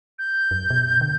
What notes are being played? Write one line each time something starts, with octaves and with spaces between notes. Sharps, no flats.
G6
F#2
B2
D3